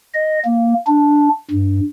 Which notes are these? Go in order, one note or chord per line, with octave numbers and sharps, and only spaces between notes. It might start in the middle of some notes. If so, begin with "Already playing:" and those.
D#5
A#3
D4
G2